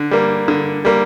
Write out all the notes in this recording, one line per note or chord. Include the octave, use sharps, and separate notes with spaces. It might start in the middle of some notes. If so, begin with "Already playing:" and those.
Already playing: D3
G3 A#3
D3
G3 A#3